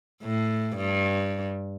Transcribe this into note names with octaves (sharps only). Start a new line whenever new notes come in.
A2
G2